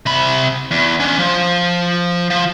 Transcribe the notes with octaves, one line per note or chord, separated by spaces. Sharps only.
C3 B5
E2
C#4 D4
F3
F3